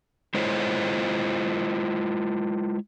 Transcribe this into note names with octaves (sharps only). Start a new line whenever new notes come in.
G#3 E4 F4 C5 C#5 D#5